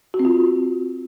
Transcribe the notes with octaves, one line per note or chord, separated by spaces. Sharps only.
F#4
C4
F4